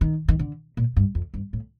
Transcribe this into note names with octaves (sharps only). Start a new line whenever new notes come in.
D#3
D#3
D3
A#2
G2
F2
G2
A2